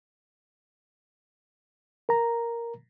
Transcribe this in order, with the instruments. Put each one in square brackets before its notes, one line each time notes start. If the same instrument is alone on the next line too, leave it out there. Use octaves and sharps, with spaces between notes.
[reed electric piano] A#4 A#5